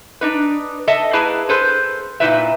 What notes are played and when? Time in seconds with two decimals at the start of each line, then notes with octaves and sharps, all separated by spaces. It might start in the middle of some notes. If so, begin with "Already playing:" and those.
0.21 D4 D#4 B4
0.88 A4 D#5 E5 A5
1.13 A#3 E4 G#4 B4 A5
1.49 G#4 A4 B4 C5
2.20 A#2 D#4 E4 B4 E5